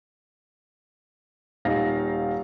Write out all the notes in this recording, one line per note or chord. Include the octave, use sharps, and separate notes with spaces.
D#1 D#4 F5 A#6